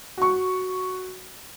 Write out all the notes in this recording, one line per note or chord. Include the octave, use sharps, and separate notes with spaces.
F#4 C#6